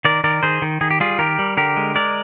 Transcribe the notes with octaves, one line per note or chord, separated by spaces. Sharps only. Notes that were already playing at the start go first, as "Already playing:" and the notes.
D#3 A#4 D5
D#3 A#4 D5
D#3 G#4 C5
D#3
D#3 G#4
G4
G3 F4 G#4
D#3 G4 A#4
G3
D3 G4 A#4
G#3
G#3 A#4 D5